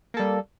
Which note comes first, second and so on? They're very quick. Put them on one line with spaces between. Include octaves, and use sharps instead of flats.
A#3 A4 G3